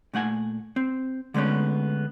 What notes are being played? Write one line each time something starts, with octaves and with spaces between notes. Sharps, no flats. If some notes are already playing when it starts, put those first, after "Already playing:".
A#2 A3 F#5 G#5
C4
D3 G#3 A3 B3 C#4